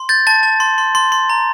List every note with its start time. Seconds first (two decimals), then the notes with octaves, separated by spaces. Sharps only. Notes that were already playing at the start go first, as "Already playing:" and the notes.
Already playing: C6
0.09 G6 A6
0.27 A5 A6
0.43 A5
0.60 C6
0.78 C6
0.95 C6
1.12 C6
1.30 A#5